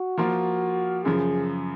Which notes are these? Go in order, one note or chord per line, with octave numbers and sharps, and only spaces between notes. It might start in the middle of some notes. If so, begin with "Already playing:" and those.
Already playing: F#4
F3 A#3 F4
F#2 C#3 F3 G#4